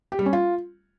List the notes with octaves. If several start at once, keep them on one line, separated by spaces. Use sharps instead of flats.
G4
G3
C#4
F4